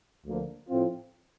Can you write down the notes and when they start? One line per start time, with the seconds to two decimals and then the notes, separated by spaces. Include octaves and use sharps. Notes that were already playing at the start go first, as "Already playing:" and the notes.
0.25 D2 D3 F3 A#3
0.69 A2 F3 C4 F4